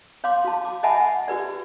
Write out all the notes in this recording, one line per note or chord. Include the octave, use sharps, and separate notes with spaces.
C#5 F5 C6 D6
F#4 A5
D6
D#5 E5 F#5 G#5 A5 B5
F#5
F#4 G4 B4 D5